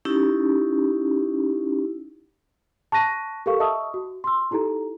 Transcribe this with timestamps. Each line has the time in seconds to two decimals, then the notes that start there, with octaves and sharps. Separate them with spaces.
0.05 C#4 D#4 E4 G4
2.92 A5 C#6 F#6 A#6 D#7
3.46 G4 A4 A#4 F5 C#6
3.60 D#5 E5 A5 C#6 D#6 E6
3.94 F#4
4.24 C6 E6
4.51 D#4 E4 G4 A4 A#5